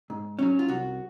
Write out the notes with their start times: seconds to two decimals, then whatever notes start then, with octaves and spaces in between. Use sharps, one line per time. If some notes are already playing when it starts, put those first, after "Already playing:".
0.10 G#2
0.39 F#3 C#4
0.59 F4
0.68 C2 F#4